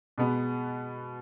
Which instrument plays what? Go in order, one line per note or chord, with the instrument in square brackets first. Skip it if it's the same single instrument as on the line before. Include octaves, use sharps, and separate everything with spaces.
[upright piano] B2 G#3 B3